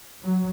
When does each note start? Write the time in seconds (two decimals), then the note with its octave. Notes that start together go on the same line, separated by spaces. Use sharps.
0.23 F#3